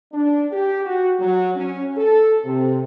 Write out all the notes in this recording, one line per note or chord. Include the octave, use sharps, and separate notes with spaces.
D4
G4
F#4
F#3
C#4
A4
C3